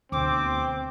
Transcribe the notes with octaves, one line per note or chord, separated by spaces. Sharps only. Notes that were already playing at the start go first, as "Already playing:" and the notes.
D2 B2 C4 D6